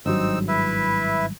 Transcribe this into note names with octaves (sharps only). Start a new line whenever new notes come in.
G#1 G2 F#3 C4 D#4 E6
E4 B4 E5